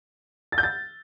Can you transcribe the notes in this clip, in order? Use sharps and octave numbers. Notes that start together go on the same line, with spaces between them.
A6
G6
A6